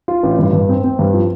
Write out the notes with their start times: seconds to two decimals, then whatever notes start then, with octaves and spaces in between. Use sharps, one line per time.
0.08 F4
0.23 A1
0.39 G2
0.53 G2
0.69 C4
0.84 C4
0.99 G2
1.13 F3